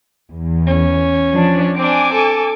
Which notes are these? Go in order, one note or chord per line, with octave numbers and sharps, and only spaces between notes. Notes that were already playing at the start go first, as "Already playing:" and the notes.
E2
C#4
F3 D4
C4 D4 G#5 D6
A4